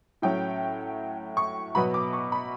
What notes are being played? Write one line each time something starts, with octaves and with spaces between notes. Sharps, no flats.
A2 F#3 C#4 G5
C#6
B2 F#3 B3 B5
D6
C#6
B5